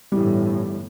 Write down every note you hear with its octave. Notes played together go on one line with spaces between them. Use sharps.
G1 A2 E3 G3